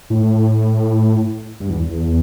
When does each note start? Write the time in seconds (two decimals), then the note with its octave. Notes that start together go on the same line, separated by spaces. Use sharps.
0.10 A2
1.60 G2
1.70 E2
1.89 E2